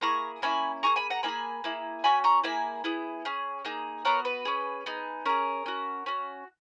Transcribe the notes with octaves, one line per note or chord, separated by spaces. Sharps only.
A#3 E4 G#4 A#5 C#6
A#3 C#4 E4 G#5 B5
A#3 D#4 G#4 A#5 C#6
G#5 B5
F#5 A#5
A#3 D#4 G#5 B5
G#4
A#3 E4 G#4
C#4 F#4 G#5 B5
A#5 C#6
A#3 E4 G#4 G#5 B5
B3 E4 G#4
C#4 G#4
A#3 D#4 G#4
B3 F#4 A#4 C#5
B4
C#4 G#4
B3 D#4 G#4
C#4 G#4 A#4
C#4 F#4
C#4 F#4